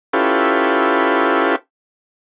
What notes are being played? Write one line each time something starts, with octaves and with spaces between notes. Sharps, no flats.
C#4 E4 F4 G4 A4 B4